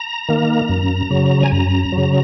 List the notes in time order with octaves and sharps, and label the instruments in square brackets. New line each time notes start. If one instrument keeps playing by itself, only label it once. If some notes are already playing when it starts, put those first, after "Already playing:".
Already playing: [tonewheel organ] A#5
D#3 A#3
F#2
C#3 F#3
G#5
F#2 A#5
F#3
C#3